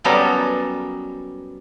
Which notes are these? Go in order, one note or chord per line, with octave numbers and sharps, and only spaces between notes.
F#3 G3 B3 C#4 A4 A#4